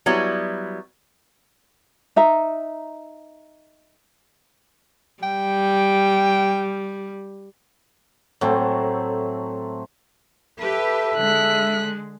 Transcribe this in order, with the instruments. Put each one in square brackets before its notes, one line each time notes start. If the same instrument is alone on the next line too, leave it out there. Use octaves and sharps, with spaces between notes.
[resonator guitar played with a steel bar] F#3 G3 B3 E4
[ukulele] D#4 E5 A#5
[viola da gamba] G3 [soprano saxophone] G5
[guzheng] A2 [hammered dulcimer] F#3 A3 C4
[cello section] G4 B4 [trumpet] A4 [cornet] E5
[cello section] D3 G#3 [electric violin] F#6 B6